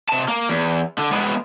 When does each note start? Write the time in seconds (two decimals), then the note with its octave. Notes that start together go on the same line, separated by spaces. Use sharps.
0.09 C3 A5
0.28 A#3
0.49 E2
0.99 D3
1.12 G#3 B3